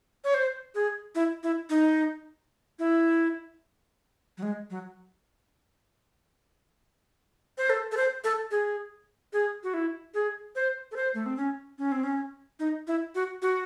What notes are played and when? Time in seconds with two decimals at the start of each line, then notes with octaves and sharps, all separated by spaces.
0.24 C#5
0.34 C5
0.75 G#4
1.15 E4
1.43 E4
1.70 D#4
2.79 E4
4.38 F#3
4.43 G#3
4.70 F#3
7.58 C5
7.70 A4
7.92 A4
7.97 C5
8.24 A4
8.51 G#4
9.33 G#4
9.64 F#4
9.74 E4
10.14 G#4
10.56 C5
10.92 A4
10.96 C5
11.14 A3
11.26 C4
11.37 C#4
11.79 C#4
11.92 C4
12.03 C#4
12.60 D#4
12.87 E4
13.15 F#4
13.42 F#4